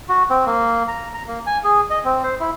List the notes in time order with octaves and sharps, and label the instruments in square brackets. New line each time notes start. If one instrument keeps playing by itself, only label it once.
[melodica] F#4
C4
A#3
A#5
A#5
A#3
G#5
G#4
D#5
C4
C5
E4